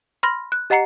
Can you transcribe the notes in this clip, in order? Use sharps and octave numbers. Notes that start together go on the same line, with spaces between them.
B5 C6 F6 A#6
F#6
G4 D#5 F#5 A#5 C7 C#7